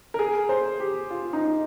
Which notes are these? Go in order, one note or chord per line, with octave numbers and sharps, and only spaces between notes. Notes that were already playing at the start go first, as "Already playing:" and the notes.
A#4
G#4
C5
G4
F4
D#4